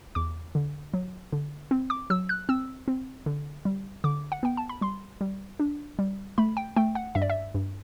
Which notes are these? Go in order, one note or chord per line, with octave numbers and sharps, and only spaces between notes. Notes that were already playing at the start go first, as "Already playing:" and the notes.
E2 D6
D3
F#3
D3
C4
D6
F#3 E6
F#6
C4 E6
C4
D3
G3
D3 D6
F#5
B3 G5
A5
B5
G3 C6
G3
D4
G3
A3 B5
G5
A3 G5
F#5
G2 E5
D5
E5
G2